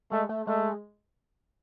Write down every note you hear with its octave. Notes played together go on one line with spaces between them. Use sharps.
G#3 A3
A3
G#3 A3